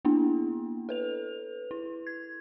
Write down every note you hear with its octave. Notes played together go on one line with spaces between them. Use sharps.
A#3 B3 D4 E4
A4 B4 F7
E4
G#6